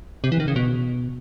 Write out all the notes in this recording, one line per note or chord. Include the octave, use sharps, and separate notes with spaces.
C3
E3
D#3
C#3
B2